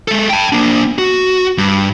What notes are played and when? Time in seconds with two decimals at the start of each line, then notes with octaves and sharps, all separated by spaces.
0.08 G#3 A4
0.29 G5 A5
0.52 A#3 D4
0.98 F#4
1.58 G2